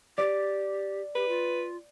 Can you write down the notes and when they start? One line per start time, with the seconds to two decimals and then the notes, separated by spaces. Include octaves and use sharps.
0.18 G4 D5
1.16 G4 B4
1.28 F4